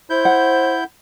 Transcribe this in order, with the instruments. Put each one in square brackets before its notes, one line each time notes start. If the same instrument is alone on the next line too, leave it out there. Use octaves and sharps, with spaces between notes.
[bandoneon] E4 G6 [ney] C5
[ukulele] F#5